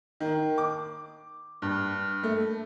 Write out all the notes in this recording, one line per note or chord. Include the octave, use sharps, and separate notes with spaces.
D#3
D6
G2
A3